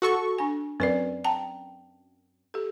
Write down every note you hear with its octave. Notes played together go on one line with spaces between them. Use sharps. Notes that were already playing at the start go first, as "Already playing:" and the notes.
F#4 A4 C#6
D4 G#5
F#2 C4 B4 D5
G5 A5 A#5
G4 A4